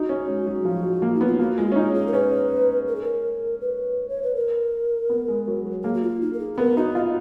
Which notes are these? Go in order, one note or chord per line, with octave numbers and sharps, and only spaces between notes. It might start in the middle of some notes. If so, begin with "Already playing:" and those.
Already playing: D#4 F#4
C#4
G#3
F#3
F3
F#3
A#3
D#4
B3
F4
A#3 F#4
G#3 F4
F#4
C#4
D#4 F4
G#4
A#4
C#4 B4
A#4
G#4
A#4
B4
C#5
B4
A#4
B3
G#3
F#3
F#3
A#3 G#4
F#4
F4
D#4
A#4
G#4
G#4
B3 A#4
D#4 F#4
F4 D#5